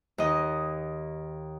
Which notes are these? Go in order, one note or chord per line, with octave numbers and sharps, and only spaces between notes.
D#2 D#5